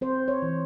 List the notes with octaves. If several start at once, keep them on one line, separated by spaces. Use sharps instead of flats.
C4 C5
C#5
E3